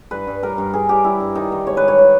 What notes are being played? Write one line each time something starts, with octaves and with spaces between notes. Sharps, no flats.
G2 B4
G2
G3 A#4
G2
G2 G#4
G3 G4
G3 E4
G2
D#3 D#4
D#3
G#2 C#5
B4
G3
C#5
C#5